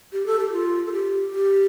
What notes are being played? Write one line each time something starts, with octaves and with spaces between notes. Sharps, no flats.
G4
A4
G4
F4
A4
G4
G4